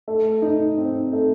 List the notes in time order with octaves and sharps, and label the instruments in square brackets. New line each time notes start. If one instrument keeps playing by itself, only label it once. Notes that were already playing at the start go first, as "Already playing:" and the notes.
[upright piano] A3
D#4
C4
A3